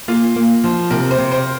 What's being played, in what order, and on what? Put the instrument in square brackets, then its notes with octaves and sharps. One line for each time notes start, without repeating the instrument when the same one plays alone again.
[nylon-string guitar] A#3 [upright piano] F4
[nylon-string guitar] A#3
F3
[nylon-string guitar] C3 [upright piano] A#4
[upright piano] C5
[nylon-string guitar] C3
[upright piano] C5